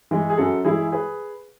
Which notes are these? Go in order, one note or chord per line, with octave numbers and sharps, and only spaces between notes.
E3 G#3
G#4
F#2 F#4 A4
E3 G#3 E4 G#4
G#4 B4